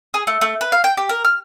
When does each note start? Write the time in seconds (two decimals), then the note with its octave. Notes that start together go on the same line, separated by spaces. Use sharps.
0.14 G#4
0.27 A3
0.41 A3
0.61 B4
0.72 F5
0.84 G5
0.97 G4
1.09 A#4
1.25 F6